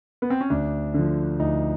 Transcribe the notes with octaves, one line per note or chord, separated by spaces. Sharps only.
B3
C4
C#4
D2 D4
D3 F3
D2 D#4